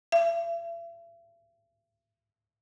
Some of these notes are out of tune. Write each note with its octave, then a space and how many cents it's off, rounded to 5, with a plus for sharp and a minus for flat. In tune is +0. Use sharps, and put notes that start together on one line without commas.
E5 +45